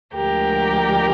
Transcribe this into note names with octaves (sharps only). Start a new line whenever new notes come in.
D2 D3 F3 G#3 G4 A#4